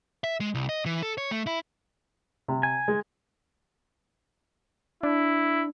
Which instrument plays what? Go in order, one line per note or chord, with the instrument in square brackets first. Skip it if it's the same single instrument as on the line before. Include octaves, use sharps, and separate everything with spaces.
[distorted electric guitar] E5
G#3
C2
D#5
E3
A4
C#5
A3
E4
[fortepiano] C3
[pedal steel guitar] G#5
[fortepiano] G#3
[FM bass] D4 [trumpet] E4